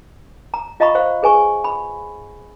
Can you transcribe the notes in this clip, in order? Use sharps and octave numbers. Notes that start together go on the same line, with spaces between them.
A#5
F4 D#5 F5 A#5 B5 C#6
C5 F5
G#4 B4 G#5 C#6
B5